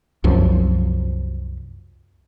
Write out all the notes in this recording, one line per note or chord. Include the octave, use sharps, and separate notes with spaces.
C2 F#2 F3